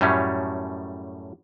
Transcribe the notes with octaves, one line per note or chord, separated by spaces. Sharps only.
F#2 A2 G3 A3 C#4